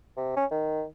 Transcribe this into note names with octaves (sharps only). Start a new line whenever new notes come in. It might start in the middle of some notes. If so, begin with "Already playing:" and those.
C3
C#4
D#3